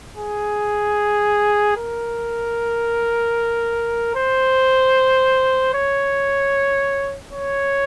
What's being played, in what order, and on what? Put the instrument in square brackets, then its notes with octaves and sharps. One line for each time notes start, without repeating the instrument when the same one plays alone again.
[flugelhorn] G#4
A#4
C5
C#5
C#5